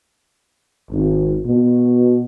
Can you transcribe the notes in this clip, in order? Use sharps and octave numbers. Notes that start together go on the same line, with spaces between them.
G#1
B2